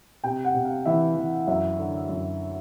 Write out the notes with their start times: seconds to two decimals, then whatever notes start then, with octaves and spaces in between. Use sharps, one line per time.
0.24 C3 G5
0.45 F#5
0.54 C3
0.65 F5
0.86 E3 E5
1.16 E3
1.47 F#2 E5
1.78 D3
2.09 F#2